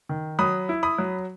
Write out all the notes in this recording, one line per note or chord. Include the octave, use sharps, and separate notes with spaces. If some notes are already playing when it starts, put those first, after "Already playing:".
D#3
F#3 B5 D#6
E4
B5 D#6
F#3